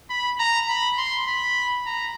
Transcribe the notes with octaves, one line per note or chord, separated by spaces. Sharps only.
B5
A#5
B5
C6
B5
A#5